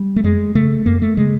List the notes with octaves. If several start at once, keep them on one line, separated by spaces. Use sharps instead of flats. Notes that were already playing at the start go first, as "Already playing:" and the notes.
Already playing: G3
A3
F#2 G#3
C#3 A3
F#2 A#3
A3
C#3 G#3